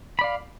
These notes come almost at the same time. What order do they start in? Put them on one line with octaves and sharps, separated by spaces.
B5 D5 F5